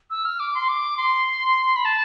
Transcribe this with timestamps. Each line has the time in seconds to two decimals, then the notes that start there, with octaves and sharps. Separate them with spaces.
0.10 E6
0.25 F6
0.40 D6
0.55 C6
0.69 D6
0.97 C6
1.76 B5
1.85 A5